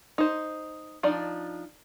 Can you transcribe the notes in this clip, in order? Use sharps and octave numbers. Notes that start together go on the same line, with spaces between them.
D#4 C5
F3 D4 D#4 D5